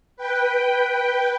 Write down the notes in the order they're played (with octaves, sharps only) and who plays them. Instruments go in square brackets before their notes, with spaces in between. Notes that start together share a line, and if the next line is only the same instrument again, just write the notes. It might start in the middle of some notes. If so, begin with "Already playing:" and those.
[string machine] B4 G5